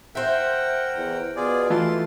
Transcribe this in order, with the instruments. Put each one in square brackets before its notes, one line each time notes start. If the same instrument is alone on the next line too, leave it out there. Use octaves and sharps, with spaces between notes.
[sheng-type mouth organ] A#4 F#5 G5 [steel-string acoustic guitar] C5 E5
[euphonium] E2
[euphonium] B2 [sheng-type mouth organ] F4 G#4 D5
[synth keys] E3 A3 F4 [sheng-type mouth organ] A5 C6